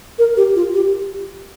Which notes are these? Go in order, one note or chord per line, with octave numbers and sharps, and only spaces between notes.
A#4
G4
F4
G4